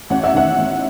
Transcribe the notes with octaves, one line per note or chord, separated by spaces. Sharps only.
A1 F#5
E5
D#3 F#5
A1